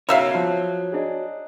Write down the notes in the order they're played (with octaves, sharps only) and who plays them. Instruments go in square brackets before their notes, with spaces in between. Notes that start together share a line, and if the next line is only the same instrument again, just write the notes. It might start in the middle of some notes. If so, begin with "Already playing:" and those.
[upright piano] B1 C#3 [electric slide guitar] F#4 C#5 [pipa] A#4 E5 F5
[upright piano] F3 C7
D4 D#4 G#4